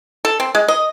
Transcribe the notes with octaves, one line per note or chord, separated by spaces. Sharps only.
A4
C4
G#3
D#5